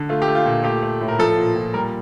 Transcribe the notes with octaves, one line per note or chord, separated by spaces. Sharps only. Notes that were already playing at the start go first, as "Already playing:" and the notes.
Already playing: D3
A3 F4
G4
A3
F4
A#2
A3 G4
A3
A2
A#4
F3 A4
A#2
A#2
G3 A#4